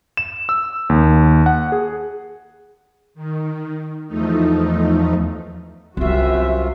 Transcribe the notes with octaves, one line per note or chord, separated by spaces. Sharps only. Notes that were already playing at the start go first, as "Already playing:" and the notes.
E7
E6
D#2
F#5
G#4
D#3
E2 F3 A3 D#4
C2 F#2 C3 G3 F4 F#4 E5